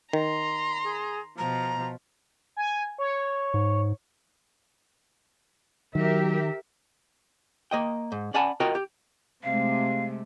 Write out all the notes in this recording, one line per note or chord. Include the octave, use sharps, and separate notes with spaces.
D#3 A#5 C6
G#4
B2 F3 A#5
G#5
C#5
G#2
D#3 F#3 G4 A#4 E5
A#3 D#5 G5
G#2
C#4 D5 F#5 G#5 A5 B5
F4 F#4 A#4 C#5 D#5 G5
G4
C3 G#3 A3 F5